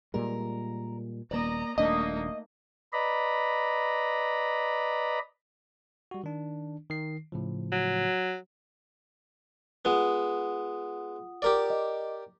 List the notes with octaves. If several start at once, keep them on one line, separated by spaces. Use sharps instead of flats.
A#2 G3 G#3 A#4
D#1 A#3 D5 D#5 A#5
D#1 A3 A#3 D4 D#4 D#5
B4 D5 D#5 A#5 B5
G3 F#4
D#3 D4
D#3 C7
A2 C#3 F3
F#3
G#3 B3 F4 F#5 D#6
G4 A#4 D5
D#5